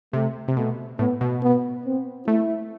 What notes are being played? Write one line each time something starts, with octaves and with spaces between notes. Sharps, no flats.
C3 A3
C3
B2 A3
A2 B3
B2
B3
C4
A3 E4